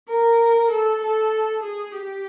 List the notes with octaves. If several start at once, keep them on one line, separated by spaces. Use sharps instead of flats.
A#4
A4
A4
G#4
G4